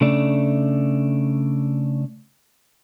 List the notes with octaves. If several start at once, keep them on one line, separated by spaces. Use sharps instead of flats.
C#3 A3 D4